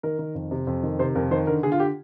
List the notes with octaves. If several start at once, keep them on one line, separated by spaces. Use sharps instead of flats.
D#3 A#4
D#3
F2
C3
F2
D#3
C3 C5
F2 A#4
D#3 C5
D3 A#4
D3 G#4
F4
G4